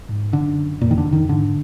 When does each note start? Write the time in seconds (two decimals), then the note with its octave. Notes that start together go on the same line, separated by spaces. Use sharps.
0.09 G#2
0.33 F#2 D3
0.81 F2 A#2
0.91 D#3
0.98 D3
1.05 F2
1.13 D#3
1.29 G#2 D3